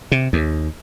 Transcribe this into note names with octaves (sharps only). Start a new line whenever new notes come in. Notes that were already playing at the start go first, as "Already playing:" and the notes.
C3
D#2